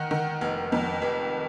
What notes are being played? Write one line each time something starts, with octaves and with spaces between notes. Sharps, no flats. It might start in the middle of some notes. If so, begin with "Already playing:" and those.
Already playing: D#3 F#5
D#3
F1
F2
F1